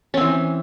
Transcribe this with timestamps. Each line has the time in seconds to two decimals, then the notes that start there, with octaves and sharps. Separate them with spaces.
0.14 C#4
0.17 C4
0.21 E3